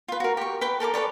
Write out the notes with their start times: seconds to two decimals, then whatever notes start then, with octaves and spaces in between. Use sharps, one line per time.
0.08 F4 B4
0.20 F#4 A#4
0.37 G4 C#6
0.61 B4 G5 B5
0.80 A4 A#4 A5 D6
0.94 A4 B4 C#5 D5